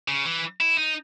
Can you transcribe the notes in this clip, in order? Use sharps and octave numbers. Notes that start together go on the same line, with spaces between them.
C#3
E3
E4
D#4